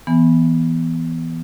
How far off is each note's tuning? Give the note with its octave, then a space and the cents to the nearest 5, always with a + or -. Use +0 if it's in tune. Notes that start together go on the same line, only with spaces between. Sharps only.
E3 +0 B3 -10 G#5 +0